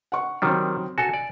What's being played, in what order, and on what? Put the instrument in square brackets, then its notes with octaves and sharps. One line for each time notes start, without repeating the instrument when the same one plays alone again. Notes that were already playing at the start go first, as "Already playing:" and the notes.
[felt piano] F#5 C#6
[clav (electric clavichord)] D#3 G3 [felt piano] F#3 C4
[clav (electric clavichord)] F#4 A4 [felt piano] G#5
[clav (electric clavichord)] D5